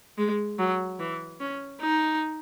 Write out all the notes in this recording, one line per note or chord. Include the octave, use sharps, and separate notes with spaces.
G#3
F#3
E3
C#4
D#4